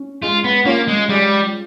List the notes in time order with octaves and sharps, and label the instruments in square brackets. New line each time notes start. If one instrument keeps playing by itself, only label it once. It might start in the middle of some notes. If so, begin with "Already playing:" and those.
Already playing: [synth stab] C#4
[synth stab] G#3 [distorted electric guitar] F4
[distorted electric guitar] B3
[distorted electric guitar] A#3 [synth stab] C#4 F4
[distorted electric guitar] G#3
[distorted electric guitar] G3 [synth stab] G#3